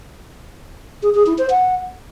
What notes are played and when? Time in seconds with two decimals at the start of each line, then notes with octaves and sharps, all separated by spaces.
1.03 G#4
1.14 G#4
1.26 E4
1.38 C5
1.50 F#5